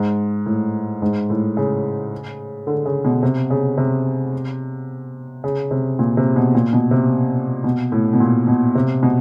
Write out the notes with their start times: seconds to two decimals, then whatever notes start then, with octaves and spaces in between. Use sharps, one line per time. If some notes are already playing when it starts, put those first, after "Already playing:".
Already playing: G#2
0.46 A2
1.02 G#2
1.30 A2
1.57 C#3
2.67 D3
2.85 C#3
3.05 B2
3.23 C3
3.50 C#3
3.78 C3
5.44 C#3
5.71 C3
5.99 A#2
6.17 C3
6.36 B2
6.55 A#2
6.73 B2
6.91 C3
7.64 B2
7.92 A2
8.14 B2
8.20 A#2
8.47 B2
8.75 C3
9.03 B2